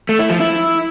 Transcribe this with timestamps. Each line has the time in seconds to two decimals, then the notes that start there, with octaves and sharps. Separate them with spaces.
0.09 A3
0.19 E4
0.30 F3
0.40 E4